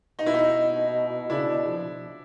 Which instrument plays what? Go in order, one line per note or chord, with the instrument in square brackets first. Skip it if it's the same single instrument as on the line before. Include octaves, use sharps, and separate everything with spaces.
[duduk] B2 [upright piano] D#4
[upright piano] E4
D#4
[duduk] C#3 [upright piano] D4 E4
[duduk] B2
F3